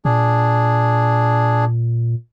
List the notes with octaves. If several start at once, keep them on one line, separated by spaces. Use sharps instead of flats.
A#2 D4 G#4